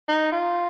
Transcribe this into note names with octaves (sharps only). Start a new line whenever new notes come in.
D#4
F4